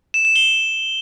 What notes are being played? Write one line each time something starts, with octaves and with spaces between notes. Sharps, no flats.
E7
E7
G7